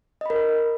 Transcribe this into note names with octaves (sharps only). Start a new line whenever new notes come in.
A#4 D#5 B5